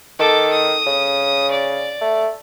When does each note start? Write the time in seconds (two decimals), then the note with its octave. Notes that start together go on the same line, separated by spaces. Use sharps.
0.19 D#3 A4 D6
0.53 D#6
0.86 C#3
1.51 D5
2.01 A3